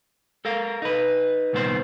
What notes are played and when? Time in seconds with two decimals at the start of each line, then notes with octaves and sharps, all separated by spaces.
0.45 A4 A#4 F5
0.82 D#4 B4
1.53 C2 A#2 D#3 B3 A4 C5